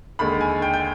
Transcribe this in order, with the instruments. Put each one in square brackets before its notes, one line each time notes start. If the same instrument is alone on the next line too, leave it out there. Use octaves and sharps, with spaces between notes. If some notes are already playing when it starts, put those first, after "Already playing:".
[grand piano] D#2 D3 G#3 B5
G#5
G5
G5